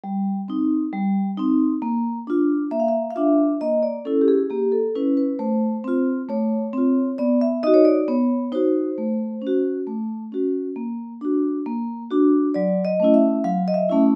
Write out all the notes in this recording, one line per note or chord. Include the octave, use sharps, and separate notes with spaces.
G3
C4 D#4
G3
C4 D#4
A#3
D4 F4
A#3 E5
F5
E5
F5
D4 F4 E5
A#3 D#5
D5
C#4 E4 A4
G4
G#4
A#3 G4
A4
C#4 E4 B4
B4
A3 C5
C4 F4
A3 C#5
C4 F4
B3 D5
E5
D#4 F#4 D#5
C#5
D5
B3 C#5
D#4 F#4 C5
A3
C#4
F#4
A3
C#4 F#4
A#3
D4 F#4
A#3
D4 F#4
F#3 D5
D#5
A3 C#4 E4
E5
F#3 F5
D#5
E5
A3 C#4 E4